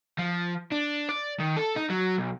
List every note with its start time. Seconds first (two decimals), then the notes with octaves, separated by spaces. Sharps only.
0.19 F3
0.72 D4
1.09 D5
1.40 D#3
1.57 A4
1.76 D#4
1.90 F#3
2.18 B1